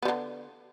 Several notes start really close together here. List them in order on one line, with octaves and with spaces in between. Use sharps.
B3 G3 D3